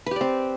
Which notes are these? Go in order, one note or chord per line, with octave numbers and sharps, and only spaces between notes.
C4 G4 B4 D5